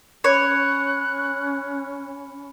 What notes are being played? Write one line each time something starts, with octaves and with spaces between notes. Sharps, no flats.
C#4 C#5 B5 F#6 C#7